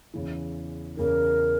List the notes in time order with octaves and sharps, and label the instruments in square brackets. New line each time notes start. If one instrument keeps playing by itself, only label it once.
[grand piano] E2 C#3 E3
[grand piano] E2 C#3 E3 [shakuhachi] A#4